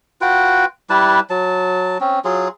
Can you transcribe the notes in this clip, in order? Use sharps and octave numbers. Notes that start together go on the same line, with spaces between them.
F4 F#4 B4 G5
G3 E4 B4 A5
F#3 A5
C4 C#4
F#3 F4 G#4